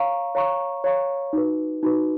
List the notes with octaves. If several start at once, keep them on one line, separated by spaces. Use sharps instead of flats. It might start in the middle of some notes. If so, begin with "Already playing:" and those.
Already playing: C#5 F5 A#5 C#6
C#5 F5 A#5 C#6
C#5 F5 A#5 C#6
D#4 F#4 B4
D#4 F#4 B4